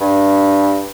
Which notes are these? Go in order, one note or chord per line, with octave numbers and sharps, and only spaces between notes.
G2